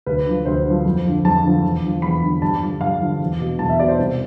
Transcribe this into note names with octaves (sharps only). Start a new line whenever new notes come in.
D2 B4
D3 F3
D2 C5
D3 F3
F2
D3 F3
F2 A5
D3 F3
E2
D3 F3
E2 B5
D3 F3
G2 A5
D3 F3
G2 F5
D3 F3
E2
B2
E2 A5
E5
B2 D5
C5
C2